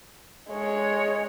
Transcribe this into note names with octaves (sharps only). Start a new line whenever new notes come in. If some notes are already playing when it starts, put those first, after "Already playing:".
G#3 C#5